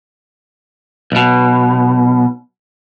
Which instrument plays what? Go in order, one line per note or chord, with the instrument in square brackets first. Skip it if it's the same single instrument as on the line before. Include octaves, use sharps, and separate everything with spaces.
[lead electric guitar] B1 B2